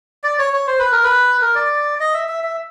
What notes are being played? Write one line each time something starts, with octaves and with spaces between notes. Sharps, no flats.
D5
C#5
C#5
C5
B4
A#4
B4
A#4
D5
D#5
E5
E5
E5